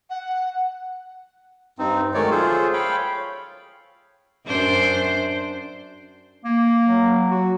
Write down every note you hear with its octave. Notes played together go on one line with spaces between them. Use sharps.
F#5
G2 C4 D#4
D#3 F#3 G#3 A3 C#5 D5
F4 G#4 A4 C5
C#5 F5 G5 B5
F#2 D4 C5
A#3
F#3
F#4